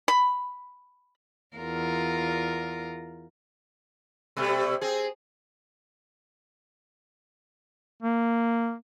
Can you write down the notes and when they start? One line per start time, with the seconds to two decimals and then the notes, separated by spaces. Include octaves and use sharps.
0.08 B5
1.56 E2 F4 A#4
4.37 B2 G3 A3
4.81 C4 G#4
8.03 A#3